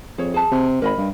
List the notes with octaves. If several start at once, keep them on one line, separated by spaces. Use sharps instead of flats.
F2 G#4 C#5
G#4 A5
C3
G#1 A#4 D#5 B5
G2